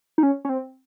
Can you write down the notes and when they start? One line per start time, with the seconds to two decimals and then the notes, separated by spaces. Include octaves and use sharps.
0.18 D#4
0.23 C#4
0.45 C#4
0.49 C4